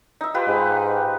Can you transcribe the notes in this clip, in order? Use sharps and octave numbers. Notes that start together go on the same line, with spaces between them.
D#4 E5
F4 G4 B4
G#2